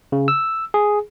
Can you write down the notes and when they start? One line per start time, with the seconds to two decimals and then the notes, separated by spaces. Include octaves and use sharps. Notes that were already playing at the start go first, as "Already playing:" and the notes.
0.12 C#3
0.28 E6
0.74 G#4